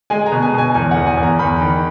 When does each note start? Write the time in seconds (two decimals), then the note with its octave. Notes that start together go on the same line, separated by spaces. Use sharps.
0.10 G#3 G#5
0.26 A#5
0.32 B2
0.43 G#5
0.54 B2 G#5
0.74 E2 G#5
0.91 E2 F#5
1.07 G#5
1.17 E2
1.23 A#5
1.39 E2 B5
1.61 D#3